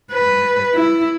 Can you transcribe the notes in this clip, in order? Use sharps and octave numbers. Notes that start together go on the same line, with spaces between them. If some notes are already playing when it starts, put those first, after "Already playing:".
B4
E4